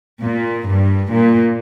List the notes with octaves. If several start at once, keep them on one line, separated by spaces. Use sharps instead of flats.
A#2
G2
A#2